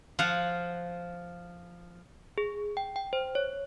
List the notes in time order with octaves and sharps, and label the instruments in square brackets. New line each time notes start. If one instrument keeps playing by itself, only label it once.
[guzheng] F3 F5 F#5
[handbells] G#4
G5
G5
C5
C#5